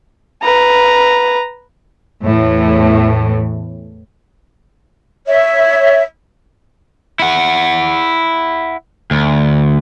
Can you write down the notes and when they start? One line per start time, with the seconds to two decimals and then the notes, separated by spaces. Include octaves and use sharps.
0.43 B4 A#5
2.25 E2 A2 E3
5.27 C#5 E5
7.19 E4 F#5
9.11 D2